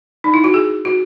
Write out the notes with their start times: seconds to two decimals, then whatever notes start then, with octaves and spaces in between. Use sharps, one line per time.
0.24 D#4
0.34 E4
0.44 F#4
0.54 G#4
0.85 F#4